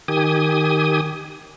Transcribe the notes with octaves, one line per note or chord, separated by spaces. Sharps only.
D#3 G4 G#5 D#6